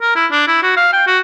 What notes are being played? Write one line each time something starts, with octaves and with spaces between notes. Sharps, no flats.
A#4
E4
D4
E4
F#4
F5
G5
F#4